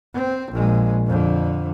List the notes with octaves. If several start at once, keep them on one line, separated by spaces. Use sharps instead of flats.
C4
A#1 G#3
F2 D3